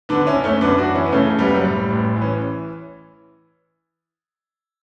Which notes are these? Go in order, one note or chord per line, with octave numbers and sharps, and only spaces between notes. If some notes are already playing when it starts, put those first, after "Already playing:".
D3 B3 D4
D4
C#4 E4
F#1
A3 C#4
F#2 B3 D4
D4 F#4
E3
C#4 E4
B3
C#3 A3 C#4
A3
F#1 G3 B3
F#3
A2 G3
A1
E3
C#4